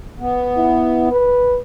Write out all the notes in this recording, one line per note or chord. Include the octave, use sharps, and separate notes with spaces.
B3
E4
B4